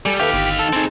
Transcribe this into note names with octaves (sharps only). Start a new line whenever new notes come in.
G3 A4 G#5
D#3 G4 A4 B4 E5 F5
G1 B6
A4
C4 D#4 G#4 A5